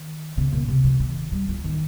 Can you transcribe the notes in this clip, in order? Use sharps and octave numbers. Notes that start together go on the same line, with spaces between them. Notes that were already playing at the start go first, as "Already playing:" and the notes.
Already playing: D#3
C#3
A#2
C3
F3
D#3
G3
F3
D#3